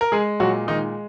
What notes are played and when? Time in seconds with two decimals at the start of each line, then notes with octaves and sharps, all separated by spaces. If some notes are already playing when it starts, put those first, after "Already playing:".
0.01 A#4
0.12 G#3 G#4
0.40 A#2 F#3 F#4
0.67 D#3 G#3 D#4